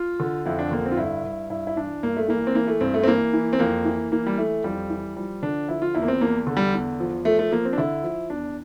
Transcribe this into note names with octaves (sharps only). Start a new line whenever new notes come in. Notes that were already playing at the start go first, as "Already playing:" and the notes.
Already playing: F4
D3
F2 E4
D4
D3 A#3
C4
F4
G2 E4
G2
G2 E4
E4
E3 D4
G2 A#3
A3
E3 A#3
C4
E3 A#3
A3
G2 C4
A3
C4
E3 A#3
E3
C4
F2 A#3
E3
E3 A#3
G3
E3 A3
F2 G3
E3
F3 G3
D3 D4
F3 E4
F4
E2 E4
A#3
C4
E2 A#3
D3
G3
E2
F3
F3 A3
A3
F3 A#3
C4
D4
D3 E4
F3
E2 D4